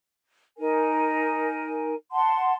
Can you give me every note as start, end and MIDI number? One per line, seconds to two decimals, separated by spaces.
0.58 1.94 63
0.58 1.94 70
0.58 1.94 80
2.12 2.54 78
2.12 2.54 81
2.12 2.54 84